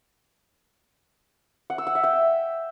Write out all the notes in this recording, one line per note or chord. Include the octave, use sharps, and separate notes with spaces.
F#5
E6
F#5
E5
G5